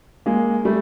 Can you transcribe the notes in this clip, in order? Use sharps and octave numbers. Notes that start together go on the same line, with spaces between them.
G#3 A#3
G3 A3